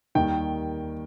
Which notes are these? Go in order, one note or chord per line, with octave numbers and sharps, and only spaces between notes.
D#2 D#3 G3 G5